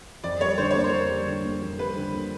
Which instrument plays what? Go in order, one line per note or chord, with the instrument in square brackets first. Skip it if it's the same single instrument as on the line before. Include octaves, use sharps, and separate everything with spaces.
[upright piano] F2 [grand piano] D5
[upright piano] G3 [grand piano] C#5
[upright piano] D3 [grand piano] C5
[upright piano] A#3 [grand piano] C#5
[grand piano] C5
[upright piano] F2
G3
D3
A#3
F2
[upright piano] G3 [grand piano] B4
[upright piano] D3
A#3